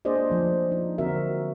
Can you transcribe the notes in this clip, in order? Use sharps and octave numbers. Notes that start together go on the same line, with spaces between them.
A#3 D4 G#4 C5 D5 D#5
F3 A3
D#4
D3 C4 F#4 A#4 E5